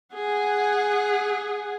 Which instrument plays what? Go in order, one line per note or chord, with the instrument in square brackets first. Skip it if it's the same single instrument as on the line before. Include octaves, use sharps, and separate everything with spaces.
[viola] G#4 F#5